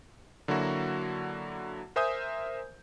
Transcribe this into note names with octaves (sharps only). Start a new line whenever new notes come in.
D3 F#3 A#3 E4 F#4
A#4 C5 E5 G#5 D#6 G6